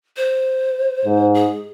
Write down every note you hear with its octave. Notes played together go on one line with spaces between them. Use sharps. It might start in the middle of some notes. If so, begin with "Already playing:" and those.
C5
G#2
G#4